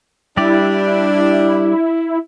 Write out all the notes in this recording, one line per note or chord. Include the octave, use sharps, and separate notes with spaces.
G3 D4 E4 G4 D5